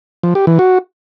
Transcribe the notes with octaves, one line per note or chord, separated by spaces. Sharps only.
F3
G4
E3
F#4